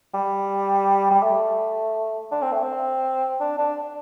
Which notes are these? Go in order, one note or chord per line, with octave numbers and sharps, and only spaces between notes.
G3
G3
A3
D4
C4
A3
C4
D4
D4